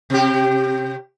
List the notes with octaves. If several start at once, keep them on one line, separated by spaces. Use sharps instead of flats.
C3 G4